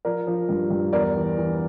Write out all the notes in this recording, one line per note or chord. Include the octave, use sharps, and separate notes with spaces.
F3 A#4 D5
F3
G2
G2
E2 A#4 D5
E3
E3